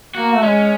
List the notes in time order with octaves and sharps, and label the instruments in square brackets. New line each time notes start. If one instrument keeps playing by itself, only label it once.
[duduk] A#3 [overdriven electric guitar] F#4
[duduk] A3
[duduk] G#3 [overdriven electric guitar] C#4